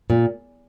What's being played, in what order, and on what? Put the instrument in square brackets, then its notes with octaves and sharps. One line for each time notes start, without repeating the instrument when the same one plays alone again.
[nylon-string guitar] A#2